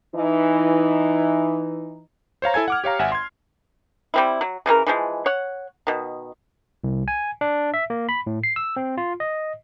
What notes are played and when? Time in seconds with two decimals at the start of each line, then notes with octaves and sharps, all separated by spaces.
0.16 E3 D#4
2.42 C5 C#5 F5 A#5
2.54 E4 A4 G#5 G#6
2.68 F#5 D6 F6
2.84 G4 C#5 F5 A#5
2.99 G#1 E5 F#5 G#5
3.12 C6 G#6
4.14 G3 C4 E4
4.41 F#3
4.66 C#3 E3 C4 A#4
4.87 E3 F3 G#3
5.26 C#5 F#5
5.87 B2 D#3
6.84 C2
7.08 G#5
7.41 D4
7.74 E5
7.90 A#3
8.09 B5
8.27 A2
8.44 C7
8.56 E6
8.76 C4
8.98 F4
9.20 D#5